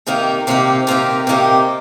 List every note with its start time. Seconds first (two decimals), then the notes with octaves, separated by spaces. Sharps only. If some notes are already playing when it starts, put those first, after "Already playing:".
0.07 C3 D#3 A#3 D#4 G4
0.47 C3 D#3 A#3 D#4 G4
0.87 C3 D#3 A#3 D#4 G4
1.27 C3 D#3 A#3 D#4 G4